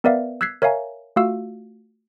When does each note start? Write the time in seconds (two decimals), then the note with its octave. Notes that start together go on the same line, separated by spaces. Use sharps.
0.04 B3 A#4 B4 D5 E5 F5
0.41 E6 F#6 G#6 B6 C7
0.62 A#4 C#5 E5 F5 G#5 A#5
1.16 A3 F4 F#4 F5 E6